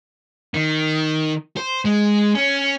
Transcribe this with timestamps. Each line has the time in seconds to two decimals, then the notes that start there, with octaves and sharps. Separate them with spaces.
0.54 D#3
1.57 C5
1.85 G#3
2.35 C#4